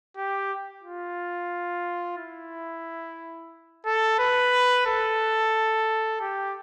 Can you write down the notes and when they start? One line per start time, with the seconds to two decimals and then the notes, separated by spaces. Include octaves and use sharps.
0.17 G4
0.84 F4
2.18 E4
3.86 A4
4.19 B4
4.86 A4
6.21 G4